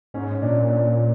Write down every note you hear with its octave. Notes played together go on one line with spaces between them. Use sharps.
G#2 C#4
A#2 D4
D4